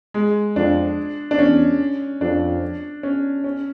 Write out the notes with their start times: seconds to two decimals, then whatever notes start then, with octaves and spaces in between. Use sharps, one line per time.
0.14 G#3
0.56 F2 D4
1.31 D4
1.38 E2 C#4
2.21 F2 D4
3.03 C#4
3.44 C#4